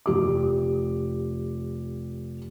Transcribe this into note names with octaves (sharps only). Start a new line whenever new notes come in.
F1 G4 D6